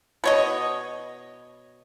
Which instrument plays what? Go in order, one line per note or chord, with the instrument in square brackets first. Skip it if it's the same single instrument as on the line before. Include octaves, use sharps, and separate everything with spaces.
[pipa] B2 C#5 D#5